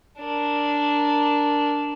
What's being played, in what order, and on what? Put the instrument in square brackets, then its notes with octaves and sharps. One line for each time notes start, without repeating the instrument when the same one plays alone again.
[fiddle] D4 A#4